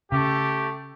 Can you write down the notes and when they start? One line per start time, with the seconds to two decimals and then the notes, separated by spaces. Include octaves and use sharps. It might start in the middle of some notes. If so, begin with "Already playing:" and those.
0.12 C#3 A3 G4